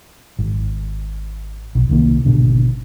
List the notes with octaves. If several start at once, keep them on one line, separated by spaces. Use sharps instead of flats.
G#1
B1
C2 D#3 A#3
G#1 B2 D3